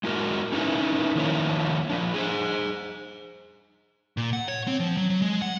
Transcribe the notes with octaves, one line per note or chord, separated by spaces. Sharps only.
G#3 E4 F#4 A#4
C#4 D#4 E4 A#4 B4
D#3 F3 A#3 E4 C5 C#5
F3 D4
G#4 C5
A#2
F#5
C#5
C4
F3
F#3
F#3
G#3
F#5